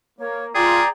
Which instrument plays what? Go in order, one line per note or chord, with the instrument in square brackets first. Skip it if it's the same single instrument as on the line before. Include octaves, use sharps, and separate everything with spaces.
[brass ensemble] A#3 [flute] C#5
[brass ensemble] F4 [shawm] G#4 [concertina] D5 G5 [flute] A#5